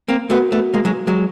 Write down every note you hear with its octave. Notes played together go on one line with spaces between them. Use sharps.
A#3 C4
A3 B3 F#4 A#4 C#5
A3 B3
G#3 A#3
F#3 G#3
F#3 G#3